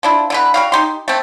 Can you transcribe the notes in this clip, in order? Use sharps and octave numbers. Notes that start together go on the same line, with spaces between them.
F3 D4 E4
D3 E3 B4
G3 F#4 F5
D#4 G4 C6
A3 C4